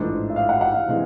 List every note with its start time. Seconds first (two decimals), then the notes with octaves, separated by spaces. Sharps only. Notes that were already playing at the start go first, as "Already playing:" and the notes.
Already playing: A1 G#2 F3 A3 D4
0.30 E5
0.36 F5
0.49 F#5
0.61 F#5
0.74 F5
0.88 C3 E3 G#3